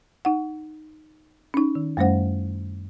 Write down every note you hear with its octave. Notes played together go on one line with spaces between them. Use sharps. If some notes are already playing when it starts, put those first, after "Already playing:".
D#4 F#5
C#4 D#4
D#3
F#2 G3 A3 C#4 C5 F#5